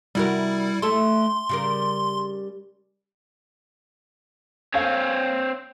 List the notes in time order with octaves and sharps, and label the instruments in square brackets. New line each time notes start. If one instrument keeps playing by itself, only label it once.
[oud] C3 F#4 A#4 [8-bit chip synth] G3 E4
[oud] A3 E4 A4 [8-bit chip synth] C6
[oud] C#3 G3 A#4
[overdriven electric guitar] C4 C#5 [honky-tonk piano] F5 G#5